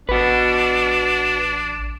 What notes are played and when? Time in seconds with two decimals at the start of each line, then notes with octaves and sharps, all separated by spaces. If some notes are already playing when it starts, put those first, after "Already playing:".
0.09 A1 D4 F#4 B4